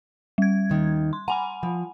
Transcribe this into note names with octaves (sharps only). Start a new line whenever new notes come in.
G3 G#6
D#2 D#3
C6
F#5 G#5 A#5 B5
F3